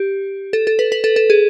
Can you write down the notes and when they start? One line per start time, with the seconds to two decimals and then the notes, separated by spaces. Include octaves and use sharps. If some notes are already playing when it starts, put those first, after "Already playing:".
Already playing: G4
0.53 A4
0.67 A4
0.79 B4
0.92 B4
1.04 A4
1.16 A4
1.30 G#4